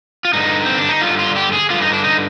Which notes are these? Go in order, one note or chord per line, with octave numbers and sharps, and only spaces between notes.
F4
G2 D3 D#4
C4
D4
D#4
G2 D3 F4
F4
G4
G#4
G2 D3 F4
D#4
D4
D#4